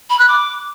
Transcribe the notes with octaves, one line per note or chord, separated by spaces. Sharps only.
B5
F#6
D6